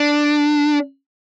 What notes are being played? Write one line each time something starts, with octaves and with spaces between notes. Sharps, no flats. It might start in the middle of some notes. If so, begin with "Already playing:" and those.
Already playing: D4